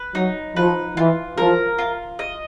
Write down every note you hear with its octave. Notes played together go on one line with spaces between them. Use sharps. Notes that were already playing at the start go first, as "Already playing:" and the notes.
Already playing: B4
F#3 D#4
F3 B4
E3 F4
F3 A#4
F4
D#5